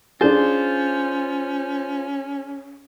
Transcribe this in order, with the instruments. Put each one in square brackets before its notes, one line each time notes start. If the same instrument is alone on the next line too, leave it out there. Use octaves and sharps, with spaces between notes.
[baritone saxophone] C#4 [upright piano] D4 G#4 [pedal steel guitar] F4 C5